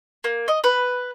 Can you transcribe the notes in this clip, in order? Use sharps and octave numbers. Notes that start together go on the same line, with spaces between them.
A#3
D#5
B4